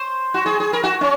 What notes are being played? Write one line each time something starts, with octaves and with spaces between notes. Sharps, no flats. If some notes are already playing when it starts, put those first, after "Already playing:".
Already playing: C5
F#4
G#4
G#4
A#4
F#4
C#4